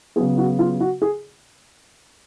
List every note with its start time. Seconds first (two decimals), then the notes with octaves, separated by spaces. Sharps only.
0.16 C#3 F#3 B3 G#4
0.38 F#4
0.59 F4
0.80 F#4
1.02 G#4